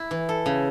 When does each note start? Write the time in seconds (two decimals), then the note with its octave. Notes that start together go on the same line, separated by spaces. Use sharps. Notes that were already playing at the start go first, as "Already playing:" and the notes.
Already playing: E4
0.11 E3
0.29 A4
0.46 C#3